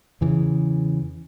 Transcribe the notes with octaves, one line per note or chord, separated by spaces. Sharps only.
E2 C#3 E3